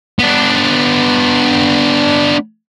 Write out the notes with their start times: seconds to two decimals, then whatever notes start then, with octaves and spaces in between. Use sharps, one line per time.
0.19 B3 D4